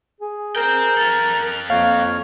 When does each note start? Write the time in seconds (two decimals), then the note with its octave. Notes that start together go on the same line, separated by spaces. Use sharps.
0.21 G#4
0.56 A#4 C5 G5
0.97 F4 A4
1.70 F2 A#3 C#5 F5 F6